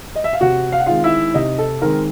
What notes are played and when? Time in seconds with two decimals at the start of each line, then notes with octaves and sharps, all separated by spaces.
0.16 D#5
0.24 E5
0.33 F5
0.41 C3 F#4 F#5
0.72 F5
0.80 F#5
0.86 D#3 G#3 C4 F4 F5
1.04 E4 E5
1.34 C3 D#4 D#5
1.59 A4
1.81 D#3 G#3 C4 A#4